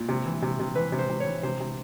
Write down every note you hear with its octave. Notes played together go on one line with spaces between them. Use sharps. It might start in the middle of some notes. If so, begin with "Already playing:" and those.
Already playing: A#2
C3
E3
C3
C3
E3 B4
C3
C5
C3
C#5
E3
C3 C5
C3